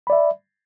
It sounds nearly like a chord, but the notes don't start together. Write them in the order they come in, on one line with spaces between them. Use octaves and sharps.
B5 D5 E5